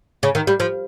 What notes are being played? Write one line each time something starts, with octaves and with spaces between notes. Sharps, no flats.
C#3
D#3
G3
F3